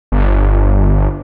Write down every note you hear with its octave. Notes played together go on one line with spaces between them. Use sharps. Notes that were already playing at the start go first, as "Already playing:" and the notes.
G1